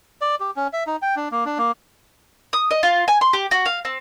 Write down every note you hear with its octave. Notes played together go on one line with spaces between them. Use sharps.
D5
G4
C#4
E5
D#4
G5
D4
A#3
D4
A#3
D#6
D#5
F4
G#5
C6
G4
F#4
F5
C4